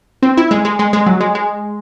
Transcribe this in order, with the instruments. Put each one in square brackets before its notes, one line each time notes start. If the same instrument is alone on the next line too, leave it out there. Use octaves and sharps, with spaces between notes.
[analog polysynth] C4
E4
G#3
G#3
G#3
G#3
F#3
G#3
G#3